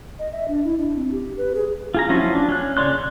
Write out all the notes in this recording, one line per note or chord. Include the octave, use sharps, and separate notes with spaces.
D#5
E5
D4
E4
D4
C4
G4
B4
G#4
F4 G#4 A#5
F3 F#3 C#4 E4 F4
D4
C#4 F#6
C#3 C#5 D5 C6 F#6
F#6